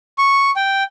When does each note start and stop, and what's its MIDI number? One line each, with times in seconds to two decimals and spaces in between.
0.18 0.51 85
0.56 0.83 79